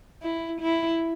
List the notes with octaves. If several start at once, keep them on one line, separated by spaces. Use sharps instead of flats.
E4
E4